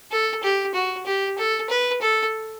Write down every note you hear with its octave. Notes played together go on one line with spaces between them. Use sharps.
A4
G4
F#4
G4
A4
B4
A4